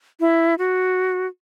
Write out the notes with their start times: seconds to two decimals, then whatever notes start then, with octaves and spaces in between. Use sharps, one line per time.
0.20 E4
0.58 F#4